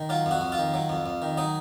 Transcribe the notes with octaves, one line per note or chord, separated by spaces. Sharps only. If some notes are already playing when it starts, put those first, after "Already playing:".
Already playing: D#3
F#3 F4
F2 F#4
F2
F4
D#3
F#3
F2
F2
D#3
F#3 D#4